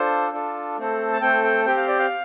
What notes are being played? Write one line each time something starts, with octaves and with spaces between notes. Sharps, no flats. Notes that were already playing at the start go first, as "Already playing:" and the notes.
Already playing: D4 F4 A4 C5
D4 F4 A4
A3 C4 A4
A5
A3 C4 A4 G5
G5
C4 G4 G5
F5
D5
F5